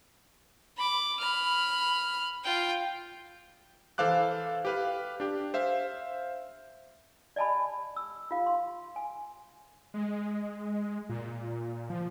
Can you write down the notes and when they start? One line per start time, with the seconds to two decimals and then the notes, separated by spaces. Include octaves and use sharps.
0.77 B5 D6
1.20 B5 F6
2.44 F4 G5
3.98 E3 A4 C5 F5 D6 F#6
4.65 G4 B4 F5
5.20 D4 G4
5.54 C5 E5 F5
7.36 D5 D#5 G#5 A5 B5
7.96 E6
8.31 F4 F5
8.46 C6
8.96 G#5
9.94 G#3
11.09 A#2
11.90 F3